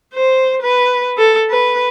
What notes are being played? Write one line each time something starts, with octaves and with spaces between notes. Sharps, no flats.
C5
B4
A4
B4